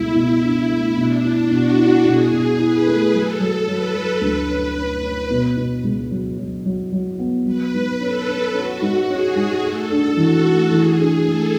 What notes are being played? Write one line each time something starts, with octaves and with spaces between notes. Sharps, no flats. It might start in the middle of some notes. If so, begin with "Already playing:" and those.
Already playing: C#2 B2 A3 E4
B2
D4
A3
B2 D4
E4
B2 F#4
E4
B2 G#4
B2
E4 B4
A3
F#3 A4
F#3
F#3 B4
F#3
D2 B4
C#4
C#4
C#4
B2
B2
C#2
F#3
F#3
F#3
F#3
B3
F#3 B4
G#2
C#4 A4
C#4
C#4 F#4
G#2
C#4 G#4
G#2
A3 A4
D4
E3 F#4
A3
E3 G#4
D4
A3 A4